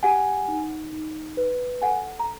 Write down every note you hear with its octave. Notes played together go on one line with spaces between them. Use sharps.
G4 F#5 G#5
D#4
D#4
B4
A4 F#5 G#5
A#5